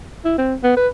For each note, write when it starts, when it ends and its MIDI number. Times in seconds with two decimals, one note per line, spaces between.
0.25 0.36 64
0.38 0.55 60
0.63 0.76 59
0.77 0.88 71